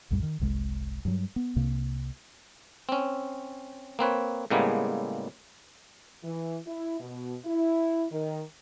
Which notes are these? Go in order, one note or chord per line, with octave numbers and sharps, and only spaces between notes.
B1 F2 A2 G3
D#3
F#1 C2 G#3
G2 F#3
B3
C2 C3 A#3
C4 C#4
A#3 C4 B4 C#5
A2 C#3 G3 G#3 A#3 B3
E3
E4
B2
E4
D#3